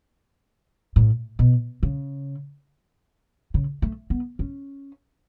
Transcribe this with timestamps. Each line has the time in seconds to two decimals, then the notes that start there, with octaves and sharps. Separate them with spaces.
0.96 A2
1.39 B2
1.83 C#3
3.54 C#3
3.82 A3
4.10 B3
4.39 C#4